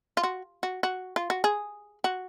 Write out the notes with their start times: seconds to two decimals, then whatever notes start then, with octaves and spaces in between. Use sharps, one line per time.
0.17 F4
0.23 F#4
0.63 F#4
0.83 F#4
1.16 F4
1.30 F#4
1.44 G#4
2.04 F#4